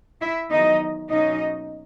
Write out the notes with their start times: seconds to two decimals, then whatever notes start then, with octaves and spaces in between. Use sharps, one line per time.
0.21 E4 E5
0.50 E2 D#3 F#3 D#4 D#5
1.09 B2 F#3 A#3 C#4 D#4 D#5